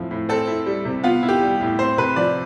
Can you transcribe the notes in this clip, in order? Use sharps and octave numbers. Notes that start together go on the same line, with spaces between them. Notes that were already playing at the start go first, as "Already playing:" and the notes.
Already playing: A2 F3 C4
A2
C4 A4
E4
G3
C3
B3 F4
E4
G4
G3
A2
C4 C5
C3 B4
F3 D5